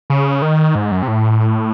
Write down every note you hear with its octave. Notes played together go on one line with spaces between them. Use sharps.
C#3
D#3
G#2
F#2
C3
A2